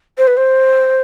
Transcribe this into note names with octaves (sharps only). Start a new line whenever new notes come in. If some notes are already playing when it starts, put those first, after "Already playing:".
C5
B4
C5